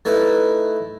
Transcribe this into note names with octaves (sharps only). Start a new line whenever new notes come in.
A3 D#4 E4 B4